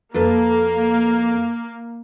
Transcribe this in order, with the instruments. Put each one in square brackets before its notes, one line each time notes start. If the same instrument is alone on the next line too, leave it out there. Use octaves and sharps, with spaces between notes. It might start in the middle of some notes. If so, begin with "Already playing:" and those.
[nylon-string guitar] F2 A4 B4 [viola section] A#3